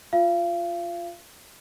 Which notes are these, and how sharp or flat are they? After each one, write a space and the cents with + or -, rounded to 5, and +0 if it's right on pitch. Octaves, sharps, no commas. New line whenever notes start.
F4 +0 F5 -35